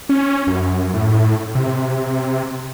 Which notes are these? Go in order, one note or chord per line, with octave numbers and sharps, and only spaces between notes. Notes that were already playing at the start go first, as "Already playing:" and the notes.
C#4
F#2
A2
C3